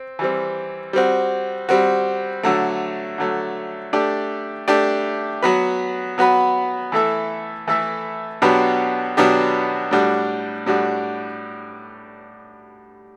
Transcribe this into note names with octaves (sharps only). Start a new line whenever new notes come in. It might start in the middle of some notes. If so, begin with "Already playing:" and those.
Already playing: C4
E3 G3 C4
G3 C4 F#4
G3 C4 F#4
D3 F#3 A3
D3 F#3 A3
A3 D4 G4 D5
A3 D4 G4 D5
F#3 B3 F#4 B4
F#3 B3 F#4 B4
E3 A3 E4 A4 E5
E3 A3 E4 A4 E5
B2 F#3 B3 D4 G4
B2 F#3 B3 D4 G4
A2 G3 D4 F#4
A2 G3 D4 F#4